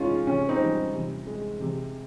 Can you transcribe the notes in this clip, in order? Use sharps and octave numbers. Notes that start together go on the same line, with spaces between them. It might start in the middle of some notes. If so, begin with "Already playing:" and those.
Already playing: C3 G#3 C#4 D#4 F4
C3 C#4
C4 D#4
G3
C3
G#3
C3